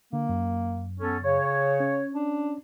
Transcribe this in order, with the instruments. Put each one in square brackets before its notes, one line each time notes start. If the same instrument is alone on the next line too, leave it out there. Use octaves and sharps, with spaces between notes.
[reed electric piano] D3 [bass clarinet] A#3
[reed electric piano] F#2
[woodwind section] B3 C#4 A4
[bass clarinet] C#3 [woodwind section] C#5
[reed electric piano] C#4
[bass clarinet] D4